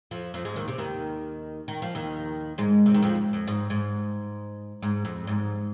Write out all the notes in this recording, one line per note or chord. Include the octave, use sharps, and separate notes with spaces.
F2 F3
F2 F3
G#2 G#3
D#2 D#3
C3
D#2 D#3
D#3
F3
D#2 D#3
G#2 G#3
C3
D#3
F2 F3
F2
G#2
G#2
G#2
F2
G#2